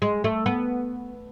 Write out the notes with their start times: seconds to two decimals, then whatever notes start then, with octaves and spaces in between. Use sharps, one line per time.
0.02 G#3
0.24 A3
0.46 B3